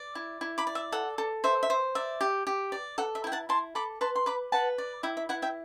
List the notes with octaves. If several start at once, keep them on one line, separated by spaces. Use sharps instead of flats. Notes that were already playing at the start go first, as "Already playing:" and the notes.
Already playing: D5
E4
E4
B5 D6
D5
E5
A4 F#5
A4
C5 E5
E5
C5
D5 E5
G4
G4
D5
A4 F#5
E5
E4 G5
F#5 A5
E4 A5 C6
A4 B5 D6
B4 A5 C6
C6
B4 B5 D6
B4 F#5 A5
D5
E4 E5 G5
E5
E4 F#5
E5 G5